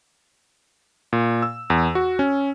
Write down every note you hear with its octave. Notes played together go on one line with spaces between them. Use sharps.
A#2
E6
E2
F#4
C#4